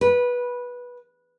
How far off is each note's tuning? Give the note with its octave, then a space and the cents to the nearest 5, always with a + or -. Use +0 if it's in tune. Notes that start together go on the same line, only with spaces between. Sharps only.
B4 -15